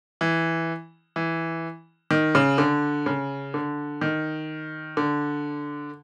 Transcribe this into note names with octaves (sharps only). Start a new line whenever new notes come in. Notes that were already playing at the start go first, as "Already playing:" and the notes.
E3
E3
D#3
C#3
D3
C#3
D3
D#3
D3